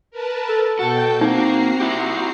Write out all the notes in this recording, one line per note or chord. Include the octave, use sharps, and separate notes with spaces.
A#4 B4 A5
A4
B2 F#4 A4 G5 G6
A#3 C4 D#4 F#4 A#5 C7
E4 G4